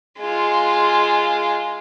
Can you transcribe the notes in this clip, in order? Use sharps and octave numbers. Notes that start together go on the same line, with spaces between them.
G#3 F4